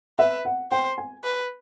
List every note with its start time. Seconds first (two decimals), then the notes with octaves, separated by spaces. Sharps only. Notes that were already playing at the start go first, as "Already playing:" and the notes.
0.19 B4 E5
0.45 F#5
0.72 C5 G5
0.98 G#5
1.24 B4